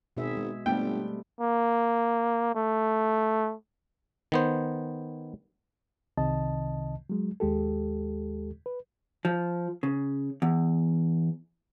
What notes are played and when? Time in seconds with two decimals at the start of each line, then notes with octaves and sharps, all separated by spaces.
0.17 G#1 B2 G#4 E5
0.37 G#3
0.66 G1 G3 A3 B3 C4 G5
1.40 A#3
2.55 A3
4.32 D#3 B3 C5
6.17 C2 C3 D#3 D#5 A5
7.10 F#3 G#3
7.40 D#2 G#3 G4 A4
8.66 B4
9.25 F3
9.83 C#3
10.42 E2